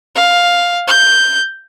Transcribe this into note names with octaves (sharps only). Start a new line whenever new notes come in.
F5
G6